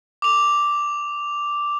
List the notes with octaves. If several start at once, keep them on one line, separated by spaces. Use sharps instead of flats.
D6 F7